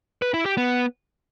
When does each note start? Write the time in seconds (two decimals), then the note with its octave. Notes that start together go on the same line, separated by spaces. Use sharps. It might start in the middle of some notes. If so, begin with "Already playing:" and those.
0.22 B4
0.34 E4
0.46 G4
0.57 B3